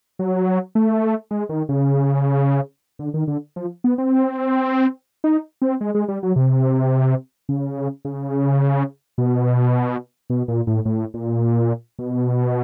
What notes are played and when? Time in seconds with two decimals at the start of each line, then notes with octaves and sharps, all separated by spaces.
0.19 F#3
0.75 A3
1.31 G#3
1.49 D#3
1.69 C#3
2.99 D3
3.14 D#3
3.28 D3
3.56 F3
3.84 B3
3.98 C4
5.24 D#4
5.62 C4
5.81 G#3
5.95 G#3
6.08 G3
6.23 F#3
6.36 C3
7.49 C#3
8.05 C#3
9.18 B2
10.30 B2
10.48 A#2
10.67 A2
10.85 A2
11.14 A#2
11.99 B2